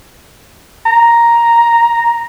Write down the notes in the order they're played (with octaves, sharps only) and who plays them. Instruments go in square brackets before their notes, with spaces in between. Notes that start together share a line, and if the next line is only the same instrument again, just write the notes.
[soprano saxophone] A#5